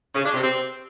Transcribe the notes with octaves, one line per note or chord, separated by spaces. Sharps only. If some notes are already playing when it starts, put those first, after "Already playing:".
C#3
D4
C3
C4